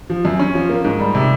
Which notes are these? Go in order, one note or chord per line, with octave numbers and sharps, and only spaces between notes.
F3
F#2
C#4
F3
A#3
G#2
G3
C3